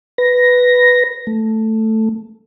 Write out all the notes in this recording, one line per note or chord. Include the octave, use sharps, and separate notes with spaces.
B4 A#6
A3